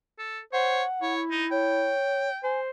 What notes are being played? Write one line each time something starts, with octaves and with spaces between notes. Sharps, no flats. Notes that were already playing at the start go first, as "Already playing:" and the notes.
A4
C5 C#5 F#5
E4 C#5
D#4
C#5 G5
C5 G#5